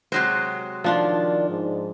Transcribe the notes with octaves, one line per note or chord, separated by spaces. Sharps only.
C3 F#3 G#3 C5
D#3 F3 D4 F4 D5
G#2